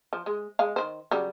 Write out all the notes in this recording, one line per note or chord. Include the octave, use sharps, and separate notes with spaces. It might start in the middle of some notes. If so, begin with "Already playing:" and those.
F3
G#3
G#3 F5
D#3 C5
C#3 F#3 G3